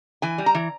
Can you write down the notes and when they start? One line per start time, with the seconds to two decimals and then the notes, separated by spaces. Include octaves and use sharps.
0.22 E3 G#5
0.38 G3
0.46 A#5
0.55 E3